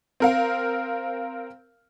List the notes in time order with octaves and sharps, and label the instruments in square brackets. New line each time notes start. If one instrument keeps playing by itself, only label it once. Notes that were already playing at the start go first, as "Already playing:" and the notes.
[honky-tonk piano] C4 A#4 F5